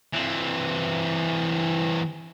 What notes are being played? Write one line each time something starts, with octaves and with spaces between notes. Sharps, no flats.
E3 C4